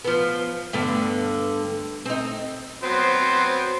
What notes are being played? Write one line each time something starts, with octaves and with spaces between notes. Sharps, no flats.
F3 B3
G2 D3 B3
C4 D#4
F#3 B3 C4 C5